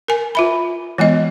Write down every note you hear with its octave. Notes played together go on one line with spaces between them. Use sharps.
A#4 G#5
F4 E5 B5
E3 G#3 B3 D#5